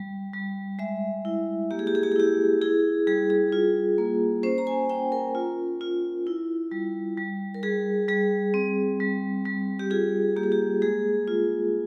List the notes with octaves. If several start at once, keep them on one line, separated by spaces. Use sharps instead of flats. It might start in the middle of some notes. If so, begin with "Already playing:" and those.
Already playing: G3
G3
G#3 E5
E4
A#3 G4
G#4
G4
G#4
G4
G#4
E4 G4
E4 G#4
G3 G#4
G#4
F4
A#3
C#4 C5
A#5
G#5
C#4 G5
A#4
F4
F4
E4
G3
G3
A#4
G3 G#4
G3 G#4
C4
G3
G3
G4
F4 G#4
A#3 G4
G#4
G4
G#3 G#4
F4